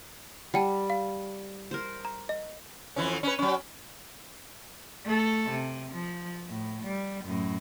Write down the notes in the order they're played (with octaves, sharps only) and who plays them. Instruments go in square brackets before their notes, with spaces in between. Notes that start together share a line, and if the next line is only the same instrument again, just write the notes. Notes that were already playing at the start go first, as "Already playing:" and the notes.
[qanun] G3 [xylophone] F#5 G5 A5
[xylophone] F5
[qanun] A#4 C5
[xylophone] A#5
D#5
[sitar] F2 E3 C#4
C#4 B4
F#3 C#4
[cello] A3 A4
C3
F3
A2
G3
F#2 A2